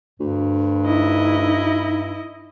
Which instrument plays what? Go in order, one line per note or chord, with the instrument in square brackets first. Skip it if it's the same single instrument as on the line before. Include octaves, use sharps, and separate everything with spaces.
[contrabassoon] D2 [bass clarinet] G2
[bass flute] D#4 [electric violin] E4 D#5